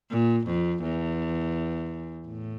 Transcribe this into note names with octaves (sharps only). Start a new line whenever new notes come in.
A#2
F2
E2
A2